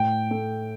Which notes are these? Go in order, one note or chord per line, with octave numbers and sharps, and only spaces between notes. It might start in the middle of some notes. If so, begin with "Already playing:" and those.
Already playing: A2 G5
A3